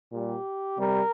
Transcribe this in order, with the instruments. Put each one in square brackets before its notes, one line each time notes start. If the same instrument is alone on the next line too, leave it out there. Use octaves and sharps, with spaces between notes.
[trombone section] A#2 G3 G4
C3 G3 A#4